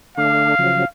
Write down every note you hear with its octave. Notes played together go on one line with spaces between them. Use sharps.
D3 A3 D4 F5
C#3 F3 F#3